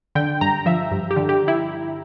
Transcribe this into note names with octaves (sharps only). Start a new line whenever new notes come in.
D3 G5
G2 A#5
F3 E5
G2
G4
D3
G4
E4